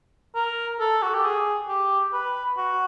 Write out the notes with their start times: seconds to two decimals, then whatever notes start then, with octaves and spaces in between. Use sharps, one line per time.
0.35 A#4
0.80 A4
1.02 F#4
1.14 G4
1.24 G#4
1.68 G4
2.13 B4
2.57 F#4